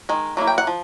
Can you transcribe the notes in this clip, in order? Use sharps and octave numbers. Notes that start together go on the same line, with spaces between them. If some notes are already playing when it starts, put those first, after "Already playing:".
D#3 G#3
F#3 A#3 E4
G5
F#5
F3